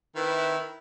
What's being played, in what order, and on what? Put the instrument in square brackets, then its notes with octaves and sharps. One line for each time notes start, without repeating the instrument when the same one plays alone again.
[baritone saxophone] D#3 [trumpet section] C4 E4 [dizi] B4